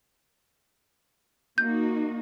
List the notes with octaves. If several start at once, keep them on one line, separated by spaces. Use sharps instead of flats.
A#3 D#4 F#4 G6